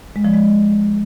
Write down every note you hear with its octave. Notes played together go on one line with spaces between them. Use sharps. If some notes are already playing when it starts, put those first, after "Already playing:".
G#3
F3
G#3